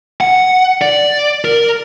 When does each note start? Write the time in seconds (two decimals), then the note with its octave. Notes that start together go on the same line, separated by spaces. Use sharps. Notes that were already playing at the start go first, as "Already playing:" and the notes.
0.21 F#5
0.82 D5
1.45 A#4